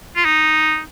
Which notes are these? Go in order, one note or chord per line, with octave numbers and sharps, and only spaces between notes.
F4
D#4